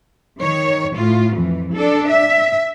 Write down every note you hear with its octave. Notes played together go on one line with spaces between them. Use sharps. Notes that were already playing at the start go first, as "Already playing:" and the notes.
D#3 C#5
A2 F4
F2 E3
D4 A4
E5